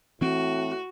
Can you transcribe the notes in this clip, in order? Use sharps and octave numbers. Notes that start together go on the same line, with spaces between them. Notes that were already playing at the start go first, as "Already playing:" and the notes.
A2 E3 C4 F#4